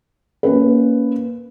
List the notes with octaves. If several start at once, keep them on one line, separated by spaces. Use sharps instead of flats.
A#3 C#4 B4